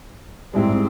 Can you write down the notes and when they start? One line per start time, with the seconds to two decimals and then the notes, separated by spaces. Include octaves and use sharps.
0.53 G#2 G3 G#3 C4 E4